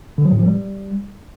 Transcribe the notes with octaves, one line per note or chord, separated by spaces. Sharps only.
D3
F#3
A2
F3
G3